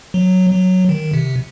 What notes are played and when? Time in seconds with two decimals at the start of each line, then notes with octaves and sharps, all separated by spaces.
0.14 F#3
0.51 F#3
0.89 D#3
1.14 C3